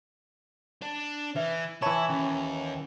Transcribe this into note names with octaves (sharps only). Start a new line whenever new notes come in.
D4
E3 B4 E5
E3 E4 C#5 A5 B5
D#2 C#4